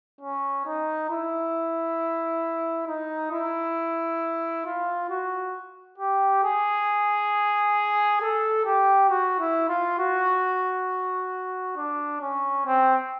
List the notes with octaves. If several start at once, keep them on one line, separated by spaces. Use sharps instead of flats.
C#4
D#4
E4
D#4
E4
F4
F#4
G4
G#4
A4
G4
F#4
E4
F4
F#4
D4
C#4
C4